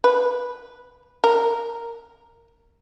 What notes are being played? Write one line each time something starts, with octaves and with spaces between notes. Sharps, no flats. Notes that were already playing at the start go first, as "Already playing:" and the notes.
B4
A#4